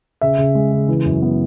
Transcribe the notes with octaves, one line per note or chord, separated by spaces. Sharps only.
C#3 E5
C#3
G#3
C#3
E3
F#2
B3